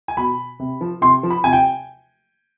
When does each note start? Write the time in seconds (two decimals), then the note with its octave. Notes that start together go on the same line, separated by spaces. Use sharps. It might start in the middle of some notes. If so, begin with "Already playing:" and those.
0.08 G#5
0.17 B2 B5
0.59 C3
0.81 F3
1.01 C3 C6
1.23 F3
1.30 B5
1.44 C3 G#5
1.53 G5